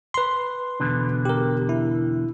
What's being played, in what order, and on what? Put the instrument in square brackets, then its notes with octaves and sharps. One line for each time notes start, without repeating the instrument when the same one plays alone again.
[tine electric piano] B4 C6
[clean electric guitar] E2 B2 D3
[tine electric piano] G4 A#4
E4